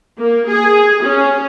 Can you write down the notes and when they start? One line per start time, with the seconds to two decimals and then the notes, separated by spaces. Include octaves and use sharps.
0.18 A#3
0.49 G#4
1.04 C#4